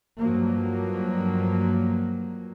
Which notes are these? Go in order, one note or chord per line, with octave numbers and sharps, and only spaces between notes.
G2 F3 F#3 A#3